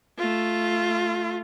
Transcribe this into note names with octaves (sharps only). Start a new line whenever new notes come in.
A3 F4